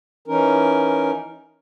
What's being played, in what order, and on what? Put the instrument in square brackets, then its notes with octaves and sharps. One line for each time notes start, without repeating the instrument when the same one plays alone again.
[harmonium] E3 C#4 D#4 A#4